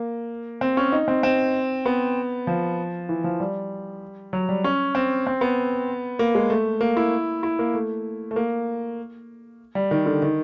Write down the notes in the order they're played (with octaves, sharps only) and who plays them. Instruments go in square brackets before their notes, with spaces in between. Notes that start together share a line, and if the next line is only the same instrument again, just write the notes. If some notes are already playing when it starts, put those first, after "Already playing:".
Already playing: [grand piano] A#3
C4
C#4
D#4
C4
C4
B3
F3
E3
F3
G3
F#3
G3
C#4
C4
C4
B3
A#3
G#3
A3
A#3
E4
E4
A#3
A3
A3
A#3
G3
D#3
D3
D#3